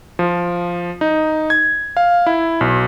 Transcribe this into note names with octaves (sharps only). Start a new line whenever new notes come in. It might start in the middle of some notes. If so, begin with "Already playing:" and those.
F3
D#4
G#6
F5
E4
B1